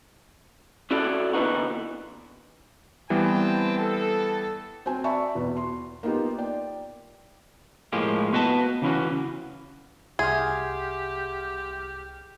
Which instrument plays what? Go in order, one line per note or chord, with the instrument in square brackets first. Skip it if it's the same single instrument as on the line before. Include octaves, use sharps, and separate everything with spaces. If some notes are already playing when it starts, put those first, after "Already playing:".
[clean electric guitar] C#4 E4 F#4 A4 D5
A#2 D3 E3 B3 D#4 F#4
[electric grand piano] E3 G3 B3 [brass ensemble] C4 G5 A5
[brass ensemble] A4
[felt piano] C4 F#4 G#5
D5 E5 A5 B5 C#6
E2 B2
C6
A#3 B3 D#4 F4 G4
D5 G5
[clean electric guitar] A2 F3 G#3 A#3 G4
B3 F#4 B4 D#5 F#5 A5
C#3 E3 C#4 F#4
[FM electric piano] C2 F6 [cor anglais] G4 [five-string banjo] G#4 [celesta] E5 F#5 C6